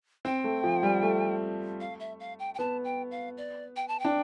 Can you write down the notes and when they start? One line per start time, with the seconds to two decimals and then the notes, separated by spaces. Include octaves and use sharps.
0.25 C4 G5
0.44 A3
0.64 F3
0.83 G3
1.03 A3
1.81 F5
2.00 E5
2.20 F5
2.39 G5
2.54 G5
2.59 B3 A5
2.84 G5
3.11 F5
3.37 D5
3.76 G5
3.88 A5
3.99 G5
4.05 D4